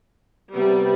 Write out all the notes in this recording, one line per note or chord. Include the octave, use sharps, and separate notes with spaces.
C3 G3 B3